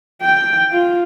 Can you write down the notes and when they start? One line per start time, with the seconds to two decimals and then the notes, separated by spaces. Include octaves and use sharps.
0.22 G5
0.72 F4